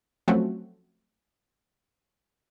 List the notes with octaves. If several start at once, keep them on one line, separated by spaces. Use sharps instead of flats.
F3 F#3 A3 C4 C#4 F#4